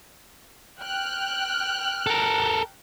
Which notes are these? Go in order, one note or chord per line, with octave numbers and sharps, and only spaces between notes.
G5 F6 F#6
A4 A#4